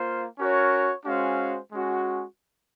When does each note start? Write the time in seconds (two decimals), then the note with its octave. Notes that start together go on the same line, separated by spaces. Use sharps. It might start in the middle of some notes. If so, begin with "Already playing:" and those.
Already playing: A#3 F4 C5
0.38 C#4 F#4 A#4 C#5
1.05 G#3 C#4 F#4 C5 F5
1.72 G#3 C#4 F#4